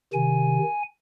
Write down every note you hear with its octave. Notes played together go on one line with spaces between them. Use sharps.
C3 D#3 G#5